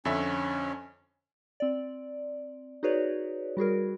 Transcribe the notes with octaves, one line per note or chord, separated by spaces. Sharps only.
F2 D3 C#4 E5
C4 D5
D#4 F#4 G#4 B4 C#5 D5
G3 F#4 G#4 A#4